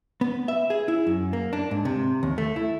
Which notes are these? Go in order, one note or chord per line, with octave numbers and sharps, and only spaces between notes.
B3
E5
G#4
E4
F#2
A#3
D4
G#2
C3
D#2
A3
E4